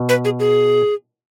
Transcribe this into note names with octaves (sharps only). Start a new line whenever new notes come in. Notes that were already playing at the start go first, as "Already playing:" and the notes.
Already playing: B2
B4
G#4
G#4